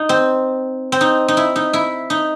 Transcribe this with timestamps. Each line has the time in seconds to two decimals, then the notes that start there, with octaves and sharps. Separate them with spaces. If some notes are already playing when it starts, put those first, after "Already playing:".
Already playing: D#4
0.09 C4
0.92 C4
1.01 D#4
1.28 D#4
1.37 E4
1.56 D#4
1.73 E4
2.10 D#4